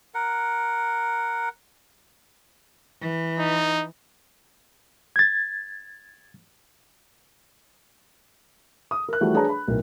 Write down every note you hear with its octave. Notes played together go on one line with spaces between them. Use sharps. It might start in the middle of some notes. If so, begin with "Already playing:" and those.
A#4 F#5
E3
D#4
G#6 A6
D#6
A#4 F#6
E3 F3 G3 A3 F#4
D4 G#4 B4 C#5 A5 A#5
B5
B1 A2 A#4